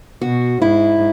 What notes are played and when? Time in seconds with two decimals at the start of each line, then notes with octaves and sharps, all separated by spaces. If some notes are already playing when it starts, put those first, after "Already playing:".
0.21 B2 F#4
0.62 G#2 E4